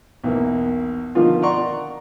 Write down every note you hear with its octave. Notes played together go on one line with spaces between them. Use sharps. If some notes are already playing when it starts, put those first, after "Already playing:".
B1 E2 A#3
B2 D3 D#3 F3 F4
D5 F#5 A#5 C6 C#6